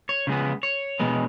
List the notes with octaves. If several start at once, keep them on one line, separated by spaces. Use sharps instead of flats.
C#5
C#3 G#3 B3
C#5
B2 G#3 B3